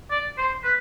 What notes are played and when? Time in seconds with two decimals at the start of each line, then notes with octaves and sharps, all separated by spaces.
0.11 D5
0.38 C5
0.64 B4